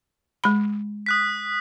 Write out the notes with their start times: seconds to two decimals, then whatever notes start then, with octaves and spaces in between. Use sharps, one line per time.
0.44 G#3 B5
1.06 D#6 F#6 B6